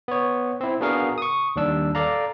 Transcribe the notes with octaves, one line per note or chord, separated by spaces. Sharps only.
B3 C#5
C4 E4
B3 D4 F#4 G#4 A#4 F5
C#6 D#6
D#2 G3 D4 E6
A4 D5 F5 A#5